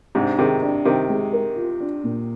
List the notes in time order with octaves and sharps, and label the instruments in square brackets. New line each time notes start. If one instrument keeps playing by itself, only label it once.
[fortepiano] G#2 C3 [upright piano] D4
[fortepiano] C3 D#3 [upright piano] G#4
[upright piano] D4
[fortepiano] C3 D#3 [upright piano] A#4
[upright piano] G#3
A#4
F4
D4
A#2